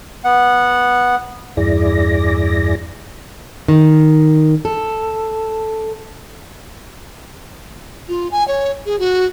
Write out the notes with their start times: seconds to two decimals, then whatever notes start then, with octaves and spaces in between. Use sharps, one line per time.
0.24 B3 F#5
1.57 E2 G2 E4 G#4 D5 A#6
3.68 D#3
4.65 A4
8.09 F4
8.31 G#5
8.48 C#5
8.86 G#4
8.99 F#4